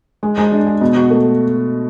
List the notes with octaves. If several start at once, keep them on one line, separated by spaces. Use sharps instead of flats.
G#3
G#3
D4
G#4
B2
F#4
A3